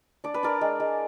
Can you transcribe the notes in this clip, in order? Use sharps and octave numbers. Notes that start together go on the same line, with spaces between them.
D4 D5
B4
D4 A#4 D5
G#3
G#3